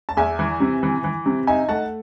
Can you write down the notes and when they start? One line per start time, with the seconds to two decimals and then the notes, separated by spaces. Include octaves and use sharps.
0.09 A5
0.17 E2 E5 G#5
0.39 E3
0.60 C3
0.83 E3
1.04 E3
1.26 C3
1.47 D#4 E5 G#5
1.69 A3 F#5 A5